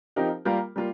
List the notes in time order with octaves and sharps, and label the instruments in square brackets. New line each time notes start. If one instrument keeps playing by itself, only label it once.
[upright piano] F3 C4 D#4 G4 A#4
G3 A#3 F4 A#4
G3 A#3 F4